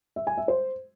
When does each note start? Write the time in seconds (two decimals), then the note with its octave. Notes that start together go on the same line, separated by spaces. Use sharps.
0.16 E5
0.27 G#5
0.37 E5
0.48 C5